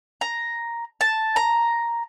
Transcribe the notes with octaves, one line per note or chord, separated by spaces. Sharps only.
A#5
A5
A#5